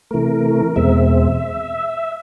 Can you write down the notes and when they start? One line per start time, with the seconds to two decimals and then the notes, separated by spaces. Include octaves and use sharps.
0.11 C3 E3 A3 A#4
0.76 E2 B2 G#3 C4 E5